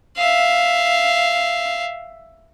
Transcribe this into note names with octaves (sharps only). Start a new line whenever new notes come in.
E5 F5